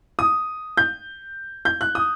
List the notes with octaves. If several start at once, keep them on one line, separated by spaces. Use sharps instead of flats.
D#6
G6
G6
F#6
D#6